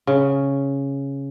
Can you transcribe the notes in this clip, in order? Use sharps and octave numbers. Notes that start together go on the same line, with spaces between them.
C#3